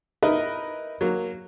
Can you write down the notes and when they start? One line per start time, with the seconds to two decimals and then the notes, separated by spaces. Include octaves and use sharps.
0.23 D#4 E4 A#4 B4 D#5
1.01 F#3 A#3